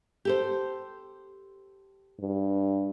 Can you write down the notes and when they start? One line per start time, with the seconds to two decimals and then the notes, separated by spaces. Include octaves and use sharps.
0.25 G4 A4 C5
2.19 G2